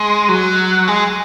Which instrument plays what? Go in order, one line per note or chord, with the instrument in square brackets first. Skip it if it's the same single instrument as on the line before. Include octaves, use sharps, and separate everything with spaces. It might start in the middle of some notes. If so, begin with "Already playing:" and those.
Already playing: [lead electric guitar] G#3
F#3
G#3